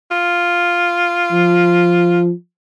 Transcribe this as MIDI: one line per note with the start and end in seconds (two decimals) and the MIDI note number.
0.11 2.21 65
1.32 2.31 53